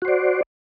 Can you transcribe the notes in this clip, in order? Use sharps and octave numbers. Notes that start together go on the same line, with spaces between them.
F#4 C5 D5